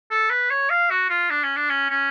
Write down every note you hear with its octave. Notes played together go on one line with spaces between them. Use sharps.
A4
B4
C#5
F5
F#4
F4
D4
C#4
D4
C#4
C#4